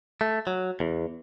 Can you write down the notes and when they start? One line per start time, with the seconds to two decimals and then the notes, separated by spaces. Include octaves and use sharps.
0.21 A3
0.47 F#3
0.80 E2